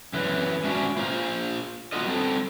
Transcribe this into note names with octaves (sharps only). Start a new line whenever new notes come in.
F#2 E3 B4
G#2 C#4 D4 F#4 E5
A#3 F4 A#4 C5 F5 A#5
A#3 B3 F4 F#4 A#4 D#5
G3 C4 A4